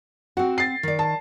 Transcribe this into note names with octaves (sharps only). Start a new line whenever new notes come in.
C4 F#4 F#5
A6 C7
D#3 D5
A5